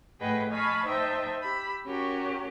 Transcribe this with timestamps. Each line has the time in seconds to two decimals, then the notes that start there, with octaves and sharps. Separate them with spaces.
0.20 A2 G#4 B4 D#5 F#5 G5
0.51 D#5 F5 G#5 A5 B5 C#6
0.85 D#4 C5 D#5 E5 G5 A5
1.41 G4 B5 E6
1.85 C#4 F#4 G4 A#4